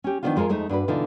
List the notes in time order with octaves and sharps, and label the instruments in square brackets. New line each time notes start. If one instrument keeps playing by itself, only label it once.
[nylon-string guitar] C#4 G4
D#3 F3 F#3 B3 D4 F4
F2 G#3 F4 G#4 A#4 F5
F2 G#3 A3 D#4
G2 D4 F#4 B4
B2 D3 E3 D#4 F4